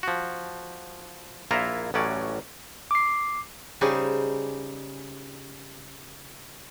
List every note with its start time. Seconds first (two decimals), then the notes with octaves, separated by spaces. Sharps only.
0.03 F3 F#4
1.51 A#1 A#3 E4 F4 E5 A#5
1.94 A1 A2 F#3 C#4 D5
2.91 D6 C7
3.81 C#3 G3 D#4 G4 G#4 C5